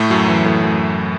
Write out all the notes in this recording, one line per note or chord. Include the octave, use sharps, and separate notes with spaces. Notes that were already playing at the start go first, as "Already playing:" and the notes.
Already playing: A2 A3
F#2 F#3
E3
A2 A3
F#2 F#3